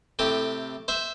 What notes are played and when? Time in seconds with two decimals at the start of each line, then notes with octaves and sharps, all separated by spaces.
0.19 A2 C3 G4
0.88 C5 E5